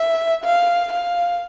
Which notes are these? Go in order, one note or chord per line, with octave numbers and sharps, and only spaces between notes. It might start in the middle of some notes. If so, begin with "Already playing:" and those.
Already playing: E5
F5
F5